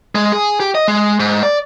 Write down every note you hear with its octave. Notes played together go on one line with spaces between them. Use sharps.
G#3
G#4
G4
D#5
G#3
G#2
D5